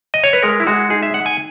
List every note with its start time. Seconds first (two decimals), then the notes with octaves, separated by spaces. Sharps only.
0.14 D#5
0.24 C#5
0.33 B4
0.43 G#3 A#4
0.60 E4
0.67 G#3 F#4
0.90 D#4 G#4
1.03 E5
1.14 D#4 F#5
1.26 G#5